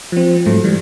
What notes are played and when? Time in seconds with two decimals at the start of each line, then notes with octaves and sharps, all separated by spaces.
0.12 F3 C4
0.46 G#2 F#3 A3
0.64 E3 G3